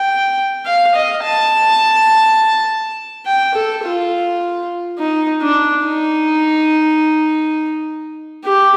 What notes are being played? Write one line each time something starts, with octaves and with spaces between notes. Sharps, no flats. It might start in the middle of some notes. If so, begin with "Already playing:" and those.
Already playing: G5
F5
D#5
A5
G5
A4
F4
D#4
D4
D#4
G4